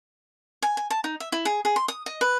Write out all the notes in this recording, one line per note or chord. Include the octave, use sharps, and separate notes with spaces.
G#5
G#5
A5
D#4
E5
E4
G#4
G#4
C6
D#6
D#5
B4